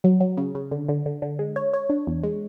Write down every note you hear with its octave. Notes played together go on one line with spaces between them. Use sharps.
F#3
F#3
C#3
C#3
D3
D3
D3
D3
G#3
C#5
C#5
D4
E2
G#3